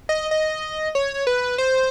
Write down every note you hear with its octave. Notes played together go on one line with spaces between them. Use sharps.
D#5
D#5
C#5
B4
C5